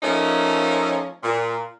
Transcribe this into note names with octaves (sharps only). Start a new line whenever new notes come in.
F3 A3 A#3 C#4 D#4
A#2